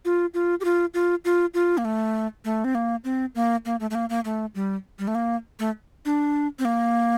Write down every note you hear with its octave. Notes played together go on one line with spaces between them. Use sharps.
F4
F4
G4
F4
F4
F4
F4
A#3
A3
A3
C4
A#3
C4
A#3
A#3
A3
A3
A#3
A#3
A3
G3
G3
A3
A#3
A3
D4
C4
A#3